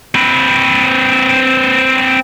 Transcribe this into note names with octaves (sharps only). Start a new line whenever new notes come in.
C4 B4